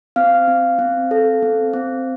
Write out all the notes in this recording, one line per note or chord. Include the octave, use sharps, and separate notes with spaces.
C4 F5 F6
C4
C4
A4
C4
C4